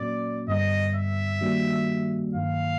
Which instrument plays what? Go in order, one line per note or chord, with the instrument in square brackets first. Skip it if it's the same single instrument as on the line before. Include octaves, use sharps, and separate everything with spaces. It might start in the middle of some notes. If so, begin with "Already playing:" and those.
Already playing: [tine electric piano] A#2 F#3 A#3 C#4 F#4 [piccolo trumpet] D5
[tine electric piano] G2 D3 G3 B3 [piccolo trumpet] D#5
[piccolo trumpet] E5
[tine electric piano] D#3 G3 A#3 D4 F#4
[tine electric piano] G2 D#3 F#3 A#3 [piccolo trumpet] F5